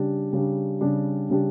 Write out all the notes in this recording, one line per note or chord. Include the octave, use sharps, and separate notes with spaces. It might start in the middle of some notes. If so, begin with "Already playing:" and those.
Already playing: C#3 G3 D4 G4
C#3 G3 D4 G4
C#3 G3 D4 G4
C#3 G3 D4 G4